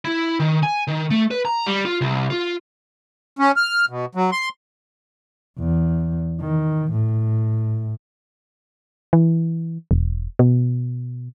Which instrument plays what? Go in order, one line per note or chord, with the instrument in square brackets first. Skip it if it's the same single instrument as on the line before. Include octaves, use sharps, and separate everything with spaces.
[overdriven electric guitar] E4
D#3
G#5
D#3
A3
B4
A#5
G3
F4
C2
F4
[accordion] C#4
F6
B2
F#3
C6
[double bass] E2
D#3
A2
[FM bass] E3
E1
B2